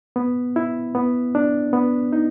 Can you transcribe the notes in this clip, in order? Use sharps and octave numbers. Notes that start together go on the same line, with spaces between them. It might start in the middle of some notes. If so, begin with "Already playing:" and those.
B3
E4
B3
D4
B3
D#4